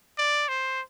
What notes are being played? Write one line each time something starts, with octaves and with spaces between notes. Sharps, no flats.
D5
C5